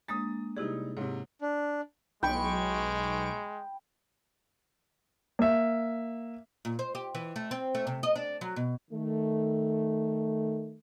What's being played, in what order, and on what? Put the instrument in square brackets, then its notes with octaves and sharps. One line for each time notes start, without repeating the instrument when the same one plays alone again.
[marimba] G#3 A#3 D4 [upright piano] D#6 A6
[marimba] C3 E4 G#4 [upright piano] G3 D#4
[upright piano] G#2 C3 [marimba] C#5
[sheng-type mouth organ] D4
[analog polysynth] B1 C#6 D7 [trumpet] G#3 [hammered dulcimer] G5 B5
[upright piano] A#3 E5
[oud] A#2
C5
G4
E3
A3
C4
A3
C3
D#5
D4
F#3
B2
[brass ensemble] D#3 A3